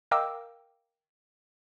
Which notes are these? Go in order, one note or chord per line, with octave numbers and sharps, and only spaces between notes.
A#4 D#5 F5 G5 D6 E6